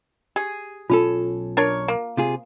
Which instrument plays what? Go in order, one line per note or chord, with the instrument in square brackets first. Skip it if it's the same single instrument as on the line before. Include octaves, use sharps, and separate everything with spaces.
[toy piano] G4 [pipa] G#4
[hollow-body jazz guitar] B1 C#4 A4 [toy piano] F4
[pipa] D4 A#4 C#5
A#3
[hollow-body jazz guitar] C3 F4 G#4